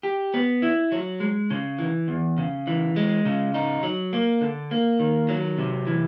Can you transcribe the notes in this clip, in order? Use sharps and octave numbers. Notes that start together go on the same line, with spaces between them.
G4
B3
E4
F#3
G#3
C#3
E3
E2
C#3
E3
G#3
C#3
D#4
F#3
A#3
D3
A#3
D#3
F#3
C3
E3